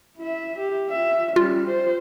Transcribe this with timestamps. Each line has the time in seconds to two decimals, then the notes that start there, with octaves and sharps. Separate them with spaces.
0.17 E4 E5
0.58 G4
0.89 F4 E5
1.36 G3 C#4 F4
1.67 C5